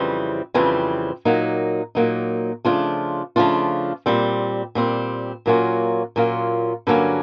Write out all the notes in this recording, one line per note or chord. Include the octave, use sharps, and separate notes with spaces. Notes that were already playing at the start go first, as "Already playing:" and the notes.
Already playing: F2 C#3 E3 G3 C4
F2 C#3 E3 G3 C4
A#2 F#3 A#3 D#4
A#2 F#3 A#3 D#4
C#3 F3 A3 D4 F4
C#3 F3 A3 D4 F4
A#2 G3 C4
A#2 G3 C4
A#2 F#3 A#3 C#4 F4
A#2 F#3 A#3 C#4 F4
G2 D3 F#3 A#3 C#4